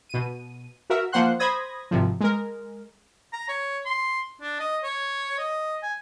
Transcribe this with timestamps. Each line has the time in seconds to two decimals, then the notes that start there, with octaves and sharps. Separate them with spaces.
0.09 B2 D#7
0.90 F#4 A#4 E5
1.12 F3 A#3 C5 F#5 C6 F#6
1.39 C5 B5 D#6 G#6 A#6
1.91 G#1 C3 F3
2.20 G#3 A#4
3.33 A#5
3.49 C#5
3.86 C6
4.42 D4
4.60 D#5
4.84 C#5
5.39 D#5
5.83 G#5